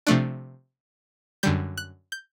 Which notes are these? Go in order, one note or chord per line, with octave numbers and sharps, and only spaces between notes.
C3 F3 A3 D4 F#6
F#2 D3 G3 G6
F#6
G6